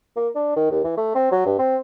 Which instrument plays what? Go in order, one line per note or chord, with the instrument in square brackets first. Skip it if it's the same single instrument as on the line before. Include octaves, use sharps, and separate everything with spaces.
[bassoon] A#3
D4
D#3
D#2
E3
A3
C4
F#3
G2
C4